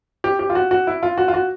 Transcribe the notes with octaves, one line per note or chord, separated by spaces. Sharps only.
G4
G4
F4
F#4
F#4
E4
F4
F#4
F4
F#4